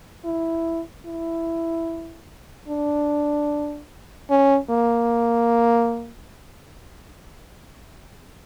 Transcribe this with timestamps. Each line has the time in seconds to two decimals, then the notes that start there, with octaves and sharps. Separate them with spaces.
0.25 E4
1.06 E4
2.68 D4
4.30 C#4
4.70 A#3